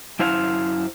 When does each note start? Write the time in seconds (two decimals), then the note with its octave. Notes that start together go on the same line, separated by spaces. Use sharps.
0.19 F#2 E4 C5 F5